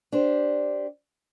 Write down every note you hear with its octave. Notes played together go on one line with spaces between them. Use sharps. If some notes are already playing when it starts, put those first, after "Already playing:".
D4 G4 C5